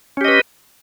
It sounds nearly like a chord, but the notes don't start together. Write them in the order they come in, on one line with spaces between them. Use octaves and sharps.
C#4 G4 D#5 B4